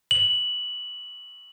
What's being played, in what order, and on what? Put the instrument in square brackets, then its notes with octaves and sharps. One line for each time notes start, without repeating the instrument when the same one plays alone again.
[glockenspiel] F#7